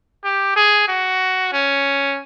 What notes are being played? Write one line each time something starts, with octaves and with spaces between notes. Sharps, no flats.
G4
G#4
F#4
C#4